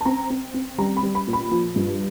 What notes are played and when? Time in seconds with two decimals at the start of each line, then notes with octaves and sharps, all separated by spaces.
0.01 A5
0.05 C4 A#5
0.30 C4
0.54 C4
0.78 G3 A#5
0.97 B5
1.03 G3
1.15 B5
1.27 A#2
1.33 B5
1.51 F3
1.76 G2